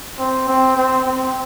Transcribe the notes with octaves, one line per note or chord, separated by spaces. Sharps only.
C4
C4
C4
C4